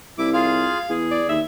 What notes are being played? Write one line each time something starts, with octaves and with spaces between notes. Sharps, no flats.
C2 E4 D6
F4 G#4 F5
E2 G#4
D5
D#2 E5